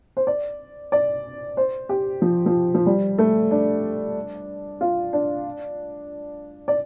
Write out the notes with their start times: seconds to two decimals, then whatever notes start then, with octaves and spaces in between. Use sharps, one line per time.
0.17 C5
0.27 D5
0.92 D5
1.57 C5
1.89 G4
2.22 F3
2.46 F3
2.75 F3
2.86 G3
3.18 A3
3.51 D4
4.81 F4
5.13 D4
6.68 D5